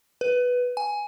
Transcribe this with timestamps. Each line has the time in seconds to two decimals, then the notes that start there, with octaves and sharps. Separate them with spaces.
0.21 B4
0.77 G#5